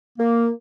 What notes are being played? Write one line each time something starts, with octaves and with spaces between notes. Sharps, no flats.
A#3